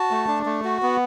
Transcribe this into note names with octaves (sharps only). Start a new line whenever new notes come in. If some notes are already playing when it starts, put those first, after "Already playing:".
Already playing: F#4 A5
A3
D4
A3
F#4
B3